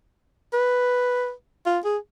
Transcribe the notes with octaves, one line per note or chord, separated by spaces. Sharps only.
B4
F4
G#4